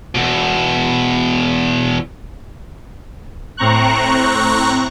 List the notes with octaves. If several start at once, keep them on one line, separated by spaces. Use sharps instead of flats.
E2 B2
A2 C4 A#5 C#6 F#6